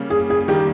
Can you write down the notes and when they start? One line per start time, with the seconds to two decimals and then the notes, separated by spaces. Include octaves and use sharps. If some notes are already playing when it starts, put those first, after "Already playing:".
Already playing: C#3 G3 A#3 C#4
0.10 G#4
0.30 G#4
0.48 D#3 G3 A#3 G4